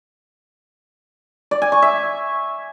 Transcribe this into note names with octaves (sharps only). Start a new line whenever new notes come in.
D5
G#5
C#6
E5